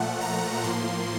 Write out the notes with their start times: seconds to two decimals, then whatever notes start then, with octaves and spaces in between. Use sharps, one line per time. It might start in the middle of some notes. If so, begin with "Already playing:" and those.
Already playing: A#2 F3 A3 F#5
0.21 A#5
0.64 A2 F3 A#3 C6